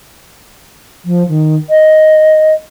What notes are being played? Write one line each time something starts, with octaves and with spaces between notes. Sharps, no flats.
F3
D#3
D#5